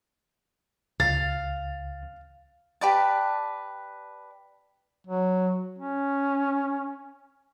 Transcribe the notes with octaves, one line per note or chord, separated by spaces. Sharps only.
C#2 F5 A6
G4 B4 D5 A5
F#3
C#4